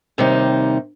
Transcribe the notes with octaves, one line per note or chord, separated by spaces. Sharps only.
D#2 C3 G3 D#4